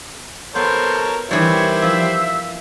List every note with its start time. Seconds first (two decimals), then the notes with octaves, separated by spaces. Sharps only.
0.55 B3 A4 A#4 C5 C#5
1.31 D#3 E3 G3 E4 G4 C5 C#5
1.82 F3 E5